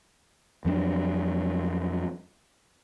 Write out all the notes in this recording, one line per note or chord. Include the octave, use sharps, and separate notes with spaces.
F2 F#3 A3 D4